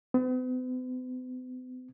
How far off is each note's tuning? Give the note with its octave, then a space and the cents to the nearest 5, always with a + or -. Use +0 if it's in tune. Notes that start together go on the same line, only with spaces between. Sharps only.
B3 +45